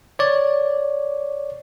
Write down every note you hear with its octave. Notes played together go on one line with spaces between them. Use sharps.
C#5 D5